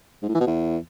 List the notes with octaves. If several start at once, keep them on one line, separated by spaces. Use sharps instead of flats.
G#2
A2
E3
B2
E2